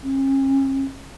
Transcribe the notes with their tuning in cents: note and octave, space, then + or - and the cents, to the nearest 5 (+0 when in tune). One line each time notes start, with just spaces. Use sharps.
C#4 -40